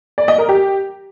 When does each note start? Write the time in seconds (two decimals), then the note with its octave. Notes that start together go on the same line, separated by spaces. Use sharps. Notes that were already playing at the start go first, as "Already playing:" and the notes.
0.18 D5
0.28 D#5
0.38 A#4
0.49 G4